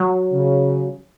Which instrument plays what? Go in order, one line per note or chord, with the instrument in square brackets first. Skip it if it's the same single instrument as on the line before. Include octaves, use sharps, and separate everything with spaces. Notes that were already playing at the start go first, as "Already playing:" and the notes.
Already playing: [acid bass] F#3
[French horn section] C#3